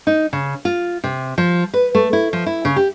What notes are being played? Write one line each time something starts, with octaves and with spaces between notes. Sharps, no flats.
D#4
C#3
F4
C3
F3
B4
A3
E4
F3
E4
C#3
G4